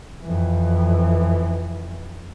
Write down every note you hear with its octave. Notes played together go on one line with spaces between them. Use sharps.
F2 E3